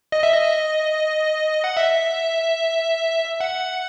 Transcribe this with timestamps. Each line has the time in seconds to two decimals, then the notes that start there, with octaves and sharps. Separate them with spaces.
0.12 D#5
0.23 E5
0.34 D#5
1.64 F#5
1.77 E5
3.40 F#5